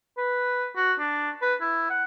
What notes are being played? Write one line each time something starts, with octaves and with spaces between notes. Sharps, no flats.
B4
F#4
D4
B4
E4
F#5